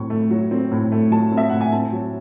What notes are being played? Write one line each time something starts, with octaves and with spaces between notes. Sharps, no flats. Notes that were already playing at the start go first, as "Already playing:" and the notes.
Already playing: A2 F#3 C4 C#6
A3
F#3
C4
A2
A3
F#3 A5
C4
E5
A2 F#5
G#5
C4 A5
F#3